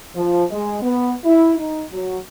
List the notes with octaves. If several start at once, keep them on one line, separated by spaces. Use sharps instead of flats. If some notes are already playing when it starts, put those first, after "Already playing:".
F3
G#3
B3
E4
D#4
F#3